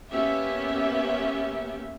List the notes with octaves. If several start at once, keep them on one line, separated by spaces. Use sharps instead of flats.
A#3 B3 C#4 G4 E5